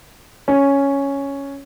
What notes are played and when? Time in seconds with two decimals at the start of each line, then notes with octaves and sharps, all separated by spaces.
0.48 C#4